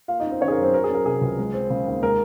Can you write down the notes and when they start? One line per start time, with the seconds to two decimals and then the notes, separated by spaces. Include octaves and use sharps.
0.08 A#3 F4 F5
0.20 D#4 D#5
0.26 C#4
0.31 C4 C5
0.41 D#3 C#4 C#5
0.48 G#4
0.52 A#4
0.57 F#2
0.63 C4 C5
0.74 F#3 A#4
0.84 G#4
0.89 C#4
0.94 A#4
1.05 C3 G#4
1.21 C#2
1.39 G#3
1.54 C4
1.70 C#3
1.87 D#2
2.03 G#3 A#4